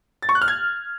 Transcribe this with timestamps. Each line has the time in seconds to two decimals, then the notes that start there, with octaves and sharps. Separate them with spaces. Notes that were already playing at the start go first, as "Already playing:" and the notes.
0.22 A6
0.29 C#6
0.35 F#6
0.42 F6
0.48 G#6